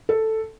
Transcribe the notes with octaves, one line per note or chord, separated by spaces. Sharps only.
A4